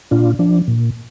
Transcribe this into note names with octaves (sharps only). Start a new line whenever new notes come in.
A#2 D4 F4
F3 D4
A#2